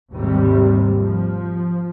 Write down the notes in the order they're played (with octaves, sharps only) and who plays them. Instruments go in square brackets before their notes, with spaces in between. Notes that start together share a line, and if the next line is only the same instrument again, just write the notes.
[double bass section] G#1 D#2 G#2 C3 D#3 G3
F3